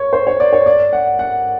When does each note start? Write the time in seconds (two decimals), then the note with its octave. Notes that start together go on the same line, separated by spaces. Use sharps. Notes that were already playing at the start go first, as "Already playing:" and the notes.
Already playing: C#5
0.13 C5
0.27 C#5
0.40 D5
0.53 C#5
0.66 D5
0.93 F#5
1.19 F#5